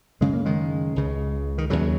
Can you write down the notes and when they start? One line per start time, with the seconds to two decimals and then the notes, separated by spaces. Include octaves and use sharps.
0.21 F#2 C#3 G#3
0.33 A#3
0.46 D#3 G#3
0.96 C#2 C#3
1.58 D#3
1.70 D#2 C#3 F#3